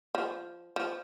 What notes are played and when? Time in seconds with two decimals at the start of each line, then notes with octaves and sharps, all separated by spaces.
0.15 F3
0.76 F3